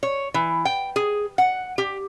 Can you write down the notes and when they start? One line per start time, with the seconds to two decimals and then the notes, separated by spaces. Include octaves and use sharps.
0.03 C#5
0.34 E3
0.65 G5
0.96 G#4
1.38 F#5
1.78 G4